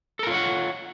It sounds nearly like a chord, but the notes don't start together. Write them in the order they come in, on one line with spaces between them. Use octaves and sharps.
A4 A#4 F4 C#5 F#5